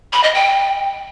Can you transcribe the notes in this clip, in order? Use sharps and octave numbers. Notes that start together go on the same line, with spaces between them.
B5
D#5
G5